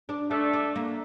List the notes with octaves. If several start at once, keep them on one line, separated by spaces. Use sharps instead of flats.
D4
A3 D4
D4
A#3